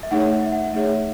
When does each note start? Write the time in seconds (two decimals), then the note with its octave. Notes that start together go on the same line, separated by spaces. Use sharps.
0.03 E5
0.11 A3 D#4 G#4 C#5 F#5
0.31 E5
0.43 E5
0.52 F#5
0.73 A3 D#4 G#4 C#5 E5